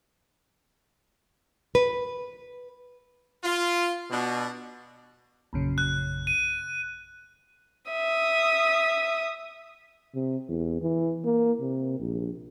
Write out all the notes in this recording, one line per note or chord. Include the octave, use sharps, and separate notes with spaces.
B4
F4
B2 D4
A#1 F#2 C#3
F#6
D#7
E5 D#6
C3
E2
E3
A#3
C3
A#1